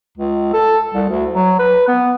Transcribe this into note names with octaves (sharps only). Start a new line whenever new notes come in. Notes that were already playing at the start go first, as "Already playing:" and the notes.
C#2
A4
C2
D2
F#3
B4
B3